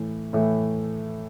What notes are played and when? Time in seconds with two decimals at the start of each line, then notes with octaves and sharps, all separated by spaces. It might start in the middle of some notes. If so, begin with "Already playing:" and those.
Already playing: A2 E3 A3
0.33 A2 E3 A3